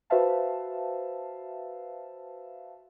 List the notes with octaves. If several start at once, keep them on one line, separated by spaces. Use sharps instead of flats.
F#4 B4 C5 E5 F5 A5